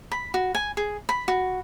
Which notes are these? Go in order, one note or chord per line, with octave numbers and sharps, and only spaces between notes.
B5
F#4
G#5
G#4
B5
F#4